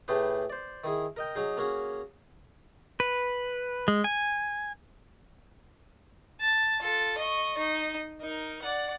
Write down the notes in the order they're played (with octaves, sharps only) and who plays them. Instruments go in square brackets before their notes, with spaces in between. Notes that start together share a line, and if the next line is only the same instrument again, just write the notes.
[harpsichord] A2 A3 G4 G#4 B4
C5 D5
D#3 E4 G#4
A#4 D#5 G5
F#3 D#4 G#4
A#3 C#4 F#4 G#4
[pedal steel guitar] B4
G#3
G#5
[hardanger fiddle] A5
F4 A4
D#5 C#6
D#4
D#4 A#4
D5 F#5